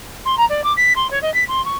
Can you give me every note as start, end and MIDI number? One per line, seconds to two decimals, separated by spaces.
0.25 0.35 84
0.37 0.45 82
0.49 0.64 74
0.64 0.73 86
0.77 0.93 95
0.95 1.10 84
1.10 1.21 73
1.22 1.32 75
1.34 1.44 95
1.48 1.63 84
1.65 1.77 85